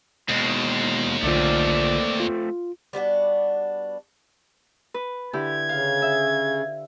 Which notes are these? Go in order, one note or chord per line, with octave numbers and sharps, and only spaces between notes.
D#2 B2 G#3
B1 D3 A3 C4 F4 D5
F4
G3 B3 D4 F#4
B4
D3 E4 G4 G#6
C#3 F5
E5